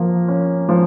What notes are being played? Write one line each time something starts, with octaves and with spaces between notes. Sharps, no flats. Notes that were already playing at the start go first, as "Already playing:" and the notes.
Already playing: F3 A#3
C#4
F3